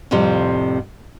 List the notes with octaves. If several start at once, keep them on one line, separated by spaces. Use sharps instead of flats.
F2 A2 C3 F3 G3